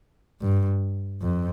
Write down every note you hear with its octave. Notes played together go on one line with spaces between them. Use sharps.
G2
F2